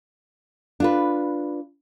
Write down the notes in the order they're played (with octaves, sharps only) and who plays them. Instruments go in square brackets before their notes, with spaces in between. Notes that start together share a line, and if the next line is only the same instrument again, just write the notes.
[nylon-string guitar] D4 F4 B4